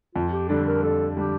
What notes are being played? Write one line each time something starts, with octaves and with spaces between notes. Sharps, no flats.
F2 F4
G4
D3 G3 D4 A4
A#4
F2 A4
D3 G3 D4 G4